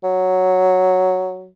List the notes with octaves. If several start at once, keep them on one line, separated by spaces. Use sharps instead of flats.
F#3